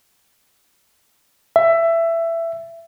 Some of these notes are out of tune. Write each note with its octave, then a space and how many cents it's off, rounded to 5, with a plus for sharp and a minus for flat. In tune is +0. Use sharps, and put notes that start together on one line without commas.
E5 +15